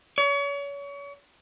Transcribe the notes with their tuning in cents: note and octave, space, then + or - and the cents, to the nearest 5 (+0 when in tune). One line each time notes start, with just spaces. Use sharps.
C#5 +35